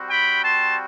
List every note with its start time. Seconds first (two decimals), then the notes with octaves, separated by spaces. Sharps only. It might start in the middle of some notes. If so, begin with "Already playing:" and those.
Already playing: G3 C4 F#4
0.10 G5 B5
0.44 A5 C6